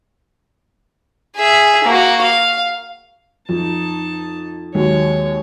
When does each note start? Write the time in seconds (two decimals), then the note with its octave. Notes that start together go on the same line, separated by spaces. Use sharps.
1.37 G#4 E5
1.84 A#3 F#4
2.22 F5
3.49 F2 D#4 A5
4.75 D#2 F#3 G#3 C#5